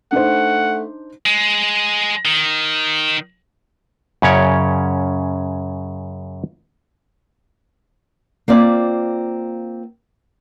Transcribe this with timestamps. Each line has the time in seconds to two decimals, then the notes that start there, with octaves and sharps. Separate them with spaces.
0.12 A3 D4 D#4 C5 F#5
1.26 G#3
2.25 D#3
4.22 F#2 C#3 C#4 C#5 D5
8.48 A#3 C4 F4 D5